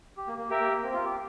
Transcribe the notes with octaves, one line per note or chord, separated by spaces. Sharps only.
G4
A#3
A#3
G4 A#4 E5
A#3
A#3
C4
F4
G4